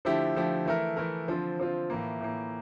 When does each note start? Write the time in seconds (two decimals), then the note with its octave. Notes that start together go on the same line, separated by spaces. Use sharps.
0.05 D3 F3 A3 E4 G4
0.35 D3 F3 A3 E4 G4
0.66 E3 A3 E4 A#4
0.97 E3 A3 E4 A#4
1.28 D3 F3 C4 F4
1.58 D3 F3 C4 F4
1.90 A2 E3 A#3
2.21 A2 E3 A#3